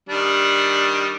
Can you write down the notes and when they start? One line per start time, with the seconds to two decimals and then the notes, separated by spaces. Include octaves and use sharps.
0.09 D#3 G3 D4